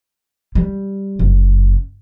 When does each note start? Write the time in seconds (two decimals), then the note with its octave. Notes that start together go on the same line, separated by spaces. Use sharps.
0.55 G3
1.19 F#1